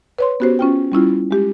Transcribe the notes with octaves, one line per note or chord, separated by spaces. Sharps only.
B4 C#5 C6
B3 C#4 F#4 G4 C5
C#4 F4 G5
G3 C#4 E4 F4
G#3 G4